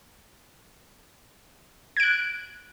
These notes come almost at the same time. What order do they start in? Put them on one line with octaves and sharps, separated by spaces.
G#6 D7 F#6